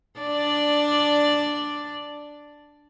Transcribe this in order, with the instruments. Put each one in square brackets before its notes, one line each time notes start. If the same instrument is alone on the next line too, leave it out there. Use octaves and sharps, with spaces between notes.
[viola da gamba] D4 D5